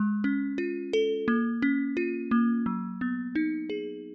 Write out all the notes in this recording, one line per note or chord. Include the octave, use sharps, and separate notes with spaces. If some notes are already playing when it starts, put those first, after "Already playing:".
Already playing: G#3
C#4
F4
A4
A#3
C#4
F4
A#3
F#3
B3
D#4
G#4